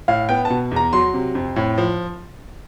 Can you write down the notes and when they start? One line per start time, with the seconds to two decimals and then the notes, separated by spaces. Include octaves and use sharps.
0.08 A2 F5
0.29 B3 G5
0.45 A5
0.50 B2
0.71 E2 A#5
0.93 F#3 C6
1.14 C3
1.35 F2
1.56 A2
1.78 F3